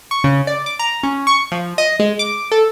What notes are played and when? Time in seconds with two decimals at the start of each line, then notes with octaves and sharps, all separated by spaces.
0.11 C#6
0.24 C#3
0.47 D5
0.66 D6
0.79 A#5
1.03 C#4
1.27 C#6
1.52 F3
1.78 D#5
1.99 G#3
2.19 D6
2.51 A4